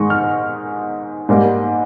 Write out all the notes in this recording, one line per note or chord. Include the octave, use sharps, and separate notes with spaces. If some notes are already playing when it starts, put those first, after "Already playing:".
Already playing: G#2 D#3 G#3 D#4 C#6
F6
G#2 G3 A#3